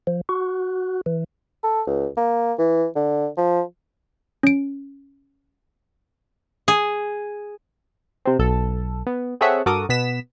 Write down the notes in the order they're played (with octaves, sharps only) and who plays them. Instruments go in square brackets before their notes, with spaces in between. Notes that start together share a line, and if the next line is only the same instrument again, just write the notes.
[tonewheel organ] F3
F#4
E3
[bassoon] A4
C#2
A#3
E3
D3
F3
[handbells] C#4 D7
[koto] G#4
[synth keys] C3 C4
B1 A4
B3
C4 G#4 A4 C#5 E5 F#5
G2 F#4 A4 A#4 D6 D#6
B2 B3 B6 E7